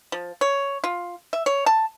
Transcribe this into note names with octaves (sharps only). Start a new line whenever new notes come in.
F3
C#5
F4
E5
C#5
A5